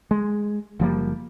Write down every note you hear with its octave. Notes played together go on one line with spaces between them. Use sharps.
G#3
F#1 F3 G3 A#3